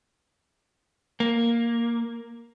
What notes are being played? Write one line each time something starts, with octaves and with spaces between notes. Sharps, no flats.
A#3